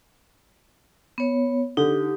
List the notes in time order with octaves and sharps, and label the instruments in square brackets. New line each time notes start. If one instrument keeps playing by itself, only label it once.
[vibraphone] B3 C#5
[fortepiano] D3 [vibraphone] D#4 G4